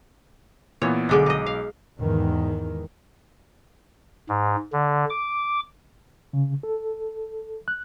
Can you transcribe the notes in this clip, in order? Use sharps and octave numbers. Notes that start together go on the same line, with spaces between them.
A#2 E3 B3 C#5
B1 D3 G#3 D4 D6
D#4 D#5
F5
E2 G#2 D#3
G#2
D3
D6
C#3
A4
F#6